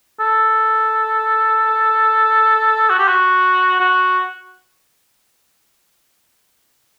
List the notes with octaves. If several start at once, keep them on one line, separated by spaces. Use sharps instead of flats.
A4
F#4
G4
F#4
F#4